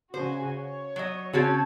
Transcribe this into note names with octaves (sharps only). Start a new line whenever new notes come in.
C#3 F#4 C5 G#5
C#5
F#3 D#5
C#3 C4 C#4 F#4 A5 G#6